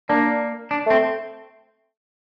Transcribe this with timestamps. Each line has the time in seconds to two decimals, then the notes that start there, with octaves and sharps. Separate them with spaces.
0.09 A#3 D4
0.71 D4
0.86 A3 C4